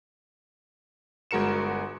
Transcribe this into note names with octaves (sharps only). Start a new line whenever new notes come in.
G1 G#3 F#4 A#4 C#7 E7